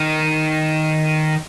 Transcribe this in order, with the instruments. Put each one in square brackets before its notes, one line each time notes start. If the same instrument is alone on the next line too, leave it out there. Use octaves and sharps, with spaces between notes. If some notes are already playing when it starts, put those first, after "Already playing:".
Already playing: [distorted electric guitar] D#3